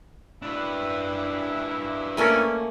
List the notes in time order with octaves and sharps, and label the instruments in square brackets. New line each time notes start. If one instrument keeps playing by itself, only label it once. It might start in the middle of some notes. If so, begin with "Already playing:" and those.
[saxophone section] F#2 B2 E4 [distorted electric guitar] D4 B4
[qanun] A3 A#3 G#5 [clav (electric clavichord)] C#4 A4 A#4